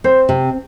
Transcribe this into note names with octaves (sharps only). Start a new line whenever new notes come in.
C4 C5
C3